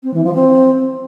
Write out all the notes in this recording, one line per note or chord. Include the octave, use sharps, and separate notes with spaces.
C4
E3
F3
C4